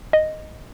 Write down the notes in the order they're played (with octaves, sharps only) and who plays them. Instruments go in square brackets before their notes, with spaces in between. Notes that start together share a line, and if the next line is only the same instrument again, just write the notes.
[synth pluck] D#5